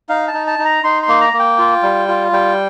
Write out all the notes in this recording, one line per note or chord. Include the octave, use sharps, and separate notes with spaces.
D#4 F5
A5
D#4
A5
D#4
A#5
D#4 C6
C6
A#3
A#5
A#3
G5
F4
G3
F4
G3 G5